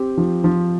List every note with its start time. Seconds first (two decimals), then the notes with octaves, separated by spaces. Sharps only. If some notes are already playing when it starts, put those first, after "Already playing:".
Already playing: C4 G4
0.17 F3
0.44 F3